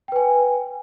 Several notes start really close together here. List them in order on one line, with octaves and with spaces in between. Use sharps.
G5 B4 G#5